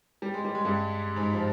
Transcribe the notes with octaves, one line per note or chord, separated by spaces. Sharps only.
G3
G#3
G3
G#3
G2 G3
G#2 G#3
F3